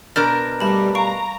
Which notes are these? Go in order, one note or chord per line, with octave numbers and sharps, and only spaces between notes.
B2 D4 A#4 F6 G6
G2 G3 A3 A5 B5
F5 A#5 C#6 D7